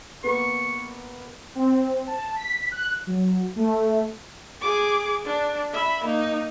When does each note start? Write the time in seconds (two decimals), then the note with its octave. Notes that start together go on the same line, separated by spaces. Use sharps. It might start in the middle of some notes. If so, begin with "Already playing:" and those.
0.24 A#3 B3 C#6
1.55 C4
2.07 A5
2.36 B6
2.71 F#6
3.07 F#3
3.56 A3
4.61 G#4 D6
5.24 D4
5.73 E5 B5
6.04 A#3 D#4